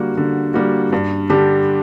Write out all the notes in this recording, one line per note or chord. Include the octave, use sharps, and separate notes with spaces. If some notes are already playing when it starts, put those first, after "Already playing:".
Already playing: D3 G3 A#3 F#4
D3
G3 A#3 F#4
G2
D3 G3 D4 G4